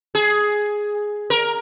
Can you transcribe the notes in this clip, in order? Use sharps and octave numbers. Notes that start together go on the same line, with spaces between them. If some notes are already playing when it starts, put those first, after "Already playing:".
G#4
A#4